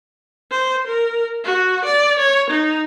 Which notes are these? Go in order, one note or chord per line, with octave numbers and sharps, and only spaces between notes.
C5
A#4
F#4
D5
C#5
D#4